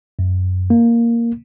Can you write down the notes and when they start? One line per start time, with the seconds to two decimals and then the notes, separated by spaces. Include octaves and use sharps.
0.19 F#2
0.70 A#3